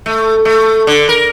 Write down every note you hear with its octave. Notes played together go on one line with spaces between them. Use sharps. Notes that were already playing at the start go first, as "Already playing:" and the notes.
A3
A3
D3
A#4